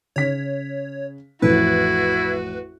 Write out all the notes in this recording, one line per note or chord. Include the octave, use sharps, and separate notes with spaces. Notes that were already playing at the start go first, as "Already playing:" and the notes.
C#3 C#5 B6
A1 F2 A2 E4 F#4 B4